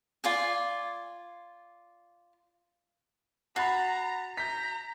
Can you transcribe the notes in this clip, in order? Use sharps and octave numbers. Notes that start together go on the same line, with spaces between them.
F4 D5 G#5
F#4 A#5 B5 A6 C7
A#5 G6 B6